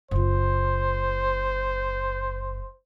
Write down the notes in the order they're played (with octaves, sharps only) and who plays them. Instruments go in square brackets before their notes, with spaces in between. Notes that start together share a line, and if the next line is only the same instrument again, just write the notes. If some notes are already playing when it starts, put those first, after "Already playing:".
[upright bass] F#1 F4 [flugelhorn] C5